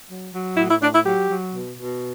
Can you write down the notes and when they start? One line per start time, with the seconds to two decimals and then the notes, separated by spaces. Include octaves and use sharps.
0.09 F#3
0.33 F#3
0.57 A2 E4
0.69 E4
0.81 A2 D4
0.93 E4
1.05 F#3 G4
1.29 F#3
1.52 B2
1.77 B2